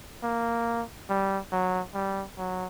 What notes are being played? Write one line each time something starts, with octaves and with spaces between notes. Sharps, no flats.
A#3
G3
F#3
G3
F#3